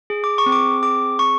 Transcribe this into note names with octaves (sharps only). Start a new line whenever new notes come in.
G#4
D6
C#6
C4
D6
G#4 D6
C4 C#6